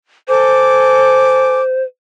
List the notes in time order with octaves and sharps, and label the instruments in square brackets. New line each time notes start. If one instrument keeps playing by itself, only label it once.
[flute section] A4 G#5 D6 [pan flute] C5